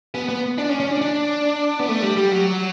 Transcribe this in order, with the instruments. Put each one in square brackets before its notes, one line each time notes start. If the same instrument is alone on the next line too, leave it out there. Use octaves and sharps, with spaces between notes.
[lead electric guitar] B3
B3
D4
C#4
C#4
D4
D4
B3
A3
G3
G3
F#3